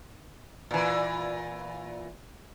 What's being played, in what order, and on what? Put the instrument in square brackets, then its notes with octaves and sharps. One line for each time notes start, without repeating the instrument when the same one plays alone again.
[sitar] A#2 E3